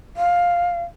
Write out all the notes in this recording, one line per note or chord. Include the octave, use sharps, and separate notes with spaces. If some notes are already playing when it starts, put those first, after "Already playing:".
F5